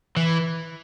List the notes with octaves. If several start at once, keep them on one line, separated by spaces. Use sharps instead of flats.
E3